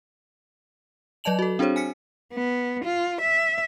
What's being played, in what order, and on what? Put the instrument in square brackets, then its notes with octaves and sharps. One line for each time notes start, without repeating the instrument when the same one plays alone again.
[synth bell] F#3 D5 D#5 A5 F7 F#7
F#4 A4
C4 D4 F#4 G#4 C5 C#5
G#5 F6 B6 C#7
[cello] B3
F4
E5